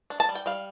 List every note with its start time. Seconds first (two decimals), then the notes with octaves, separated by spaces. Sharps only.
0.10 D4
0.20 A5
0.29 G3
0.35 G5
0.46 G3 F5